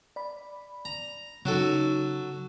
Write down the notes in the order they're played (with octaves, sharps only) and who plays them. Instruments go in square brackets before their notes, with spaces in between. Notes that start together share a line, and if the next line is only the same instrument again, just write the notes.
[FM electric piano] D5 B5
[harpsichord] A#5
[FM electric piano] C#3 D#4 [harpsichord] F#3 F#4 A4